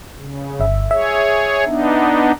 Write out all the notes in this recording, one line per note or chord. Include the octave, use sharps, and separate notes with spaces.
C#3
G1 E5
G#4 C#5 E5
B3 D4 D#4